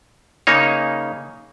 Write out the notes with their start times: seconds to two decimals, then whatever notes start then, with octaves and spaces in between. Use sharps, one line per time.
0.47 C#3 A#3 D#4 C#5